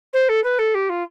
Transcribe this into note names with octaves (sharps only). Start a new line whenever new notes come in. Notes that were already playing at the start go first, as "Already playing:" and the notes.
C5
A4
B4
A4
G4
F4